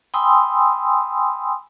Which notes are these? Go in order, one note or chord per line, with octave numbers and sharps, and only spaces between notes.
G5 G#5 B5 C6 D#6 E6